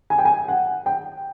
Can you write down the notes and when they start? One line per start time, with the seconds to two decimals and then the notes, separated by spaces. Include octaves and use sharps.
0.10 G#5
0.18 G5
0.25 G#5
0.48 F#5
0.86 G5